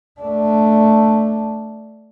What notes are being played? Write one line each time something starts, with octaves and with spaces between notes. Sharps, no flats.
A3 D4